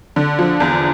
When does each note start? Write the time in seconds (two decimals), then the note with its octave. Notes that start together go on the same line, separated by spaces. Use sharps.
0.16 D3
0.39 F3
0.60 E2